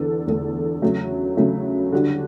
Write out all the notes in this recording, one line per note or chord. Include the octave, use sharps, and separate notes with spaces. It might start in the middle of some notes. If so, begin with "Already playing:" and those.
Already playing: E2 D3 D4 A4
E2 D3 A3 D4 A4
C#3 F#3 A3
C#3 F#3 A3
D3 G3 D4 F#4